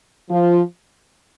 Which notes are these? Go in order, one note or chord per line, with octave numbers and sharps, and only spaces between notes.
F3